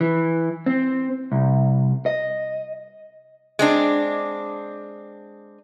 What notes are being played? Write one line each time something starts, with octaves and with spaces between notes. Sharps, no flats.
E3
C4
C2
D#5
G#3 C4 D4